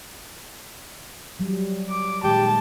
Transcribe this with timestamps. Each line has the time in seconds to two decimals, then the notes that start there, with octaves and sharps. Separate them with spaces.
1.39 F#3 G3
1.89 D6
2.24 A#2 D#3 G#3 G4 A5